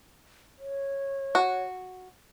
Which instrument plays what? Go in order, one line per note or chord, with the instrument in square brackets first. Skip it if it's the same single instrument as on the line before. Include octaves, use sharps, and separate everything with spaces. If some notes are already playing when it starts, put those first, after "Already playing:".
[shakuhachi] C#5
[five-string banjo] F#4